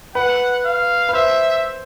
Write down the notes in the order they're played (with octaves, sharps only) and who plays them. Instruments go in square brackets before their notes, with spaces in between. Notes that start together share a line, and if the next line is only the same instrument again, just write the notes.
[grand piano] B4 [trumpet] F#5
[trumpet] F5
[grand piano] B4
[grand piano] C5 [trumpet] E5